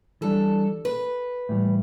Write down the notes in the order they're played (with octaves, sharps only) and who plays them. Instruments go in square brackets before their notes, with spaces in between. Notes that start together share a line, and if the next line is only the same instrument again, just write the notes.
[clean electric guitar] E3 G3 D4 [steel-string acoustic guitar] A4
[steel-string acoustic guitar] B4
[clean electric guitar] A2 E3 G3